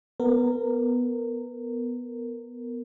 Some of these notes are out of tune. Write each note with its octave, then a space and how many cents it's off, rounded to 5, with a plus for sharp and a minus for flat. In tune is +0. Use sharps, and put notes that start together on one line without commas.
B3 +0 A#4 -20